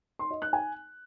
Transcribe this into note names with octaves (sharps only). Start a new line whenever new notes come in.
C6
D#5
F#6
G#5